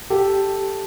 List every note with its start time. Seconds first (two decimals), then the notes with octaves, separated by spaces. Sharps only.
0.10 G4 A4